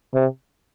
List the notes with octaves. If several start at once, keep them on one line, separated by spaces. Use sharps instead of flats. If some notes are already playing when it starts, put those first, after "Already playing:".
C3